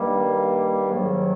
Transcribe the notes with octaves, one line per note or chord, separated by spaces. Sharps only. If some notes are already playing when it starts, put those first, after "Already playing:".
Already playing: G2 D#3 G3 A#3
G#2 D#3 F#3